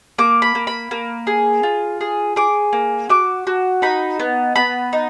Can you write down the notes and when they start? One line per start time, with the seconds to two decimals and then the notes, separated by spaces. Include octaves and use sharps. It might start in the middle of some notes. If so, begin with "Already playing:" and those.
0.18 A#3 D6
0.42 B5
0.55 A#3
0.67 B5
0.91 A#3
1.27 G#4
1.63 F4
2.01 G#4
2.36 G#4 D6
2.73 A#3
3.09 F#4 D6
3.47 F#4
3.82 D#4 B5
4.20 B3
4.56 B3 B5
4.93 D#4